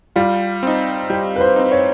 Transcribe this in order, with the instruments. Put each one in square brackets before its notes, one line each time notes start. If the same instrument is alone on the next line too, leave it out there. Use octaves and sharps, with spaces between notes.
[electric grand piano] G3 [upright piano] F4
[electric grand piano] C4 D#4
[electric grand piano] G3 [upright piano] G4
[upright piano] B4
C5
[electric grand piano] C4 D#4
[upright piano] C#5